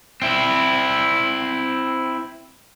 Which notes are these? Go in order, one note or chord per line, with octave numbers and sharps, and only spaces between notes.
C4 E4